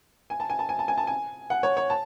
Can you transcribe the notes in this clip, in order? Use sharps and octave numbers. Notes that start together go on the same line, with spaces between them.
G#5
A5
G#5
A5
G#5
A5
G#5
A5
G#5
F#5
C#5
C#5
A5